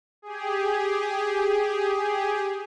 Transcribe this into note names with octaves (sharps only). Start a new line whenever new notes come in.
G4 G#4